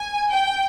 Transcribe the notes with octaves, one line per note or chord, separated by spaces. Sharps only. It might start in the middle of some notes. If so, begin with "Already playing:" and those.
Already playing: G#5
G5